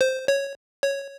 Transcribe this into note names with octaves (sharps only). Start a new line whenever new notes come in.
C5
C#5
C#5